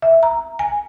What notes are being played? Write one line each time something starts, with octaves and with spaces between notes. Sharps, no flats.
E5
A#5
G#5